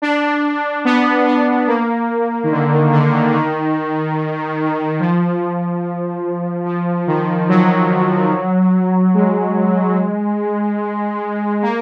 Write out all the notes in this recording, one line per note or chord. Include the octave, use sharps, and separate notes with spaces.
D4
B3
B3
A#3
D#3
D3
D#3
D3
D#3
D#3
F3
F3
D#3
F#3
G#3
A#3